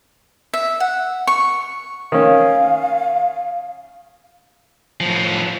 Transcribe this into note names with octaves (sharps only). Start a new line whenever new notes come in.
E5
F#5
C#6
D#3 C#4 F5
A2 F3